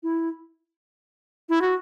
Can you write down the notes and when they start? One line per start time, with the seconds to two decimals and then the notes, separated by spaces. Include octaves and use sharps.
0.03 E4
1.49 E4
1.62 F#4